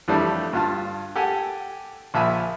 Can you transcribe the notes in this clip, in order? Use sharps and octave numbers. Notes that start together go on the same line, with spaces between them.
F2 E3 G3 A3 D4
G2 F4 A5
G4 A4 F#5 G#5
A#1 F3 E5 G#5 B5